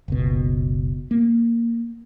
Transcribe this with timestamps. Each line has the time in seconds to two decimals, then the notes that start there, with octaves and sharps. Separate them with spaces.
0.08 F#1 C#2 B2
1.11 A#3